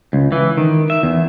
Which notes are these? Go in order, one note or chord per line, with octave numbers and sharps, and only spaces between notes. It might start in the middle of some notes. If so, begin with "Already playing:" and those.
C#2
E3
D#3
E5
E2